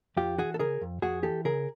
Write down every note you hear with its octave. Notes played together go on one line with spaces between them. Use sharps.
F2 F4 G4
E3 F#4 G#4
A4
C#3 G#4 A#4
F2
F2 F#4 G#4
E3 G4 A4
C#3 G#4 A#4